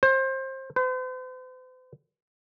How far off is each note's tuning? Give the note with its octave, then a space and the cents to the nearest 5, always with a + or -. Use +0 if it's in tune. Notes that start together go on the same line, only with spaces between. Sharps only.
C5 +25
C5 -45